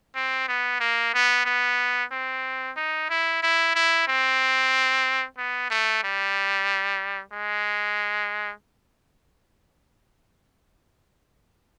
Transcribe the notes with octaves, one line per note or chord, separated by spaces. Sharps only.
C4
B3
A#3
B3
B3
C4
D#4
E4
E4
E4
C4
B3
A3
G3
G#3